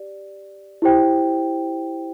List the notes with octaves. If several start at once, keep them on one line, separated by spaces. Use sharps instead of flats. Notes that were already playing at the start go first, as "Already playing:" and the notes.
Already playing: G4 D5
E4 G4 C5 G5